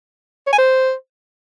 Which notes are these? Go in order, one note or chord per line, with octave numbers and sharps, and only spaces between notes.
C#5
G#5
C5